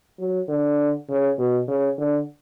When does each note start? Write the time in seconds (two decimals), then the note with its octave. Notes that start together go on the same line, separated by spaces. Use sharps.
0.19 F#3
0.48 D3
1.09 C#3
1.38 B2
1.68 C#3
1.98 D3